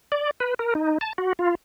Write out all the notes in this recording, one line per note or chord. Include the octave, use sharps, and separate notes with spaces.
D5
B4
A#4
D#4
A5
F#4
F4